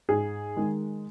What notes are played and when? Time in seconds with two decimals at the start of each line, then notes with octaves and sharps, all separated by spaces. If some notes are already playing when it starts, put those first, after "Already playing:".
0.09 G#2 G#4
0.57 D#3 G#3